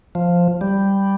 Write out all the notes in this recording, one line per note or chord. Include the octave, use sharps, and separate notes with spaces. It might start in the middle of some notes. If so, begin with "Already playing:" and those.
F3
G3